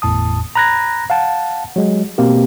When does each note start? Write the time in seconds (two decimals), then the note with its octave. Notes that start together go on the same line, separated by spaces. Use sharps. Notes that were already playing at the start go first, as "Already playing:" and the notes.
0.02 G1 E2 A2 A5 D#6
0.55 A#5 B5 F#6 G#6 A#6
1.10 F5 F#5 A5
1.76 F#3 G#3
2.18 B2 A#3 C4 G4